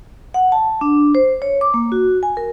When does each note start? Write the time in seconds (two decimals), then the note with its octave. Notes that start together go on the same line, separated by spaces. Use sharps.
0.34 F#5
0.52 A5
0.81 D4
1.15 C5
1.42 C#5
1.61 D6
1.74 A#3
1.92 F#4
2.23 G#5
2.37 A#4